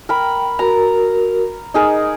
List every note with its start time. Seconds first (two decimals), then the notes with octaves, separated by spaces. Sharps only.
0.09 A#4 G5 B5
0.59 F#4 A#4 A#5
1.74 D#4 G#4 A#4 D#5